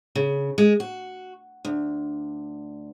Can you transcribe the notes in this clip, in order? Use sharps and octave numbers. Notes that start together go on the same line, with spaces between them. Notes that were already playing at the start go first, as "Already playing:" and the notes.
C#3
G#3
F#4
D2